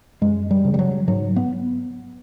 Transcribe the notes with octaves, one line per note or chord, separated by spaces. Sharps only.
F#2 G#3
G3
C#3
G3
F#3
G#2 F#3
B3